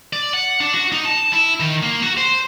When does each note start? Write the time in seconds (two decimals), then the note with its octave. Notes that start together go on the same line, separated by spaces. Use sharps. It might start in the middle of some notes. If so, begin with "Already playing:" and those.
0.13 D5
0.34 F#5
0.61 D4
0.74 F#4
0.92 D#4
1.05 A5
1.33 E4
1.60 D#3
1.83 A#3
2.03 F#4
2.17 C5